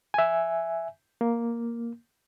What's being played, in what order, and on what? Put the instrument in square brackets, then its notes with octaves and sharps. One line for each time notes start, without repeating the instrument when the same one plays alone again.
[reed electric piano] E5 G#5
A#3